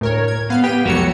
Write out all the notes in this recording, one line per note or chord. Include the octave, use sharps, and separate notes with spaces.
D2 A2 A#4 C#5
G#6
B3 F5 F6
B3 G4 G5 D#7
C2 F2 F#3 F#4 G4 C#5 C#7